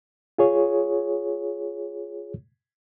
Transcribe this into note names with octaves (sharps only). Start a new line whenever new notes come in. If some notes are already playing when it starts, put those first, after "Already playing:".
F4 G#4 C#5